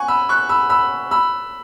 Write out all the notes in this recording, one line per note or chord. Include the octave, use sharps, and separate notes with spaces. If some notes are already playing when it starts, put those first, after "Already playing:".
Already playing: F#5 G#5 C#6
B5 E6
C#6 F#6
B5 E6
B5 E6
B5 E6